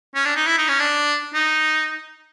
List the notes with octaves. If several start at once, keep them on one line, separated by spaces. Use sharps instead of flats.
C#4
D4
D#4
E4
D#4
C#4
D4
D#4